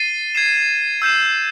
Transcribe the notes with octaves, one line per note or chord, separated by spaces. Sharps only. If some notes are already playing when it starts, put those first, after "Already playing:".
Already playing: A6 C7 D#7 G7
G#6 C7 E7
E6 G6 C7 E7